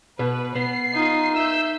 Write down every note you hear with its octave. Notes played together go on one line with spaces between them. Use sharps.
B2 B4
B3 C7
D#4 F4
E5 E6 G6